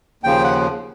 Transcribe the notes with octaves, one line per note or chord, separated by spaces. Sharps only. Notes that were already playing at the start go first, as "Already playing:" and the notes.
D#2 C#3 F3 G5
F#5